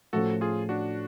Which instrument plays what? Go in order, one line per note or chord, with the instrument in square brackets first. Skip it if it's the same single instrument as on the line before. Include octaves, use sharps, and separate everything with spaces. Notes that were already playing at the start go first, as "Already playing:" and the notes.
[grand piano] A2 F3 A3 C#4 [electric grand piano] F#4 A4
[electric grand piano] F4 G#4
D4 F#4